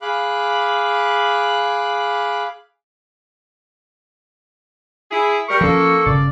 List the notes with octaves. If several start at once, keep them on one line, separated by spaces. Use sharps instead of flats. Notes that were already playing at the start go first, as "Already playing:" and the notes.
G#4 F5 B5 D6 F#6
E4 G#4
G3 A#4 C#6
F3 A#3 C#4 A4
G1 C#3 D5